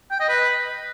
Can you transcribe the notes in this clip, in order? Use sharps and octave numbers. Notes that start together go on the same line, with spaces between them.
G5
D#5
B4